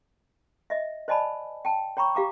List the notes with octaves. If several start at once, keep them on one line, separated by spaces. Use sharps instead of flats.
D#5 E5
C5 D5 D#5 G#5 A5 B5
G5 A5
C#5 G5 A#5 B5 C#6
G4 F5 A#5 D6